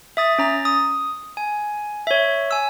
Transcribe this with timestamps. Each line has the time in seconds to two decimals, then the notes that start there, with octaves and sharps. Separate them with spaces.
0.17 E5 D#6 A6
0.39 C#4 A#5 A6
0.65 D#6
1.37 G#5
2.07 C#5 E5
2.51 G#5 E6